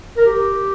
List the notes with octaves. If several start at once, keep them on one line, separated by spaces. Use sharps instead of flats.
A#4
G4